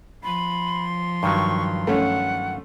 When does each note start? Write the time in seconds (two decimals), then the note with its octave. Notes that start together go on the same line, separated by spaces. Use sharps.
0.24 F3 B5 C6
1.23 G2 D#3 F#3 C#6
1.87 A3 C#4 F#5